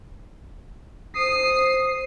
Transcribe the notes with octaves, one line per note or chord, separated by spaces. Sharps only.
C5 D#6 C7